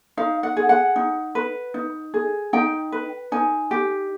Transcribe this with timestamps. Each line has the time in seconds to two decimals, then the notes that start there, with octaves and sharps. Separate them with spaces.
0.17 D#4 F5
0.43 F#5
0.57 G#4
0.69 F#5
0.96 D#4
1.35 B4
1.74 D#4
2.14 G#4
2.53 D#4 G5
2.92 B4
3.32 D#4 G#5
3.71 G4